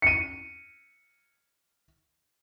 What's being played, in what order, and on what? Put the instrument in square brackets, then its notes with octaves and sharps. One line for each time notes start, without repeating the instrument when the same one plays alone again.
[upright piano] C#7 D#7